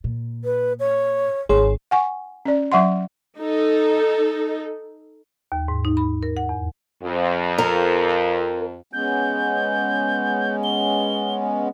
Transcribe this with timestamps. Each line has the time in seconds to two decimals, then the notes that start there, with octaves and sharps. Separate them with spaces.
0.04 A#2
0.45 B4
0.80 C#5
1.49 G#1 G#4 C#5 C6
1.91 F#5 G#5 C#6
2.45 C#4 D5
2.72 F#3 E5 F#5 C6
3.38 D#4 A4
5.52 D#2
5.68 G#2
5.85 D#4
5.97 B5
6.23 A#4
6.37 F#5
6.49 E2
7.03 F2
7.58 A#4
8.93 G#3 B3 C#4 G6
10.64 G7